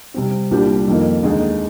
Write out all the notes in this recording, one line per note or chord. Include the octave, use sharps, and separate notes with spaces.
C3 G3 C4
C2 A#2 G3 D4 G4
F2 D#3 A#3
D#2 D3 G#3 D#4 G#4